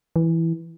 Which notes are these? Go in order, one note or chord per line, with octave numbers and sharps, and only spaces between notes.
E3